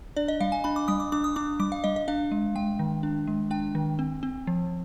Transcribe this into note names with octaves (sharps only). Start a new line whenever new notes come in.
D4 D5
D#5
G3 F5
G#5
D4 B5
D6
G3 D#6
D6
D4 D6
D#6
D4 D6
G3 D6
F5
G3 D#5
D#5
D4 F5
G#3
G#3 G5
D#3
D4
G#3
D4 G5
D#3
C4
C4
F3